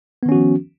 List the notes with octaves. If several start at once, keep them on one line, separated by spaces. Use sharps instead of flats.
D#3 F3 B3 C#4 F#4